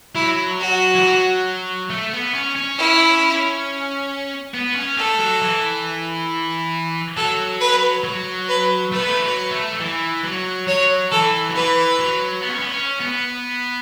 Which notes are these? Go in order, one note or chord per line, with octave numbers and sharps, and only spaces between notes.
F#3 E4
F#4
E3
F#3
A3
B3
C#4
C#4
E4
B3
C#4
A3 A4
F#3
E3
F#3 A4
B4
F#3
B4
A3 B4
B3
A3
E3
F#3
A3
F#3
E3
F#3
F#3 C#5
E3 A4
F#3
E3 B4
F#3
B3
C#4
B3
C#4
B3